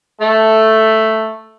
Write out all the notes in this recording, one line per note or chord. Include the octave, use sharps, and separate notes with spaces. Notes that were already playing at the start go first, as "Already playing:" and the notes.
A3